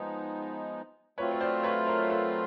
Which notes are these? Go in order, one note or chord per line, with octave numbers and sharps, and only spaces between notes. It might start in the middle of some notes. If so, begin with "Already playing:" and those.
Already playing: F3 G#3 B3 D#4
F#3 A3 C4 F4 B4 C#5
C#5
C5 D5
B4 C#5
A#4 C5
A4 B4